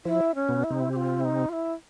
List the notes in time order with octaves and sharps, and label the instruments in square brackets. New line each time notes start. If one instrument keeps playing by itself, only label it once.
[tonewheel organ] F3 [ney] E4
[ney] C#4
[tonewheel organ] B2 B3
[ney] E4
[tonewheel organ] C3 C4 [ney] D#4
[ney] E4
G4
F4
E4
D#4
F4
E4